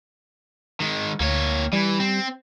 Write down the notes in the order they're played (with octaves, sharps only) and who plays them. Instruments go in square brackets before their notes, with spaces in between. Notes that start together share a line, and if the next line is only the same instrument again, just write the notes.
[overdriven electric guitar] D#3 G#3
[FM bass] D2 [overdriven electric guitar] A#3 C#5
[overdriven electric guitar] E3 [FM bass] G3
[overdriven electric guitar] C4